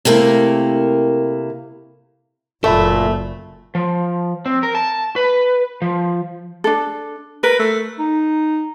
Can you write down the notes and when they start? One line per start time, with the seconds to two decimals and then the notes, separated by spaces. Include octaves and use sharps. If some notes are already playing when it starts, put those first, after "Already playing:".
0.05 C3 A3 A#3 E4 A#4
2.64 F#1 A#2 A3 A4 E5 B5
3.75 F3
4.46 C4
4.63 A#4
4.75 A5
5.16 B4
5.82 F3
6.64 D4 A4
7.43 A#4 B4
7.59 A3
7.99 D#4